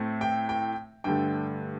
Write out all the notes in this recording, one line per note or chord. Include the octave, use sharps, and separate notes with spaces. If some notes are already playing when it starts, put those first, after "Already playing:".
Already playing: A2 A3 C4
G5
G5
G2 D3 A3 G5